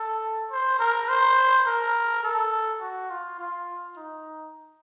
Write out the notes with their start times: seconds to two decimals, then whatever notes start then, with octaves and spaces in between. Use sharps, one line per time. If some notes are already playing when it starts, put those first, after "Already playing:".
Already playing: A4
0.51 C5
0.79 A#4
1.09 C5
1.67 A#4
2.24 A4
2.82 F#4
3.10 F4
3.40 F4
3.97 D#4